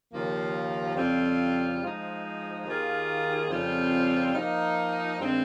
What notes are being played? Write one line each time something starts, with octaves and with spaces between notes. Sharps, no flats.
D#2 C#3 F3 A#3 F4
F2 C#3 G3 C4 F4
F3 G#3 D#4
D#2 D#3 A#3 F4 G#4
F2 C#3 G3 C4 F4
F3 A#3 D#4
G2 D#3 G#3 C4